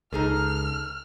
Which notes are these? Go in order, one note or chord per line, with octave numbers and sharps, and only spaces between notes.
C#2 D#4 G#4 A4 F6